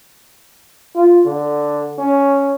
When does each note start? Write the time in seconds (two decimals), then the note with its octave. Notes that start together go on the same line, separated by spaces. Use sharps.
0.95 F4
1.25 D3
1.98 C#4